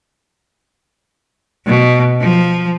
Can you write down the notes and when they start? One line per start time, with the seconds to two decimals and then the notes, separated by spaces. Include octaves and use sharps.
1.67 B2
2.21 F3